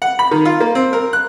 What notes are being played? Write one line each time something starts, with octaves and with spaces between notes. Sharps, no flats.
F#5
B5
D#3
F4
A#3
C4
A#4
F#6